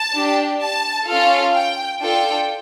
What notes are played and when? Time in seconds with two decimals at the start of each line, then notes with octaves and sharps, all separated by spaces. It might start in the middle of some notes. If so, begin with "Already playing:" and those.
Already playing: A5
0.15 D4 G4
0.61 A5
1.07 C#4 F4 A4 F5
1.54 G5
2.01 D4 F4 A4 G5